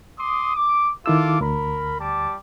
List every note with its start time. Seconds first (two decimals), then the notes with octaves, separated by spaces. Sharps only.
0.18 C6 D6 D#6
0.55 D6
1.06 D#3 E4 F4 A4 D6 E6
1.41 D2 A#4 B5
2.00 G3 A5 D6